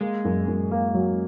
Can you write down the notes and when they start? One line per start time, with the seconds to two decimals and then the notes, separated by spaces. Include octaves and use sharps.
0.01 G#3 A#3
0.25 F#2
0.48 F#2
0.71 A#3
0.94 F#3